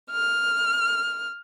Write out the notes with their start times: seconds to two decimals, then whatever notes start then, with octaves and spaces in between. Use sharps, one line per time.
0.11 F6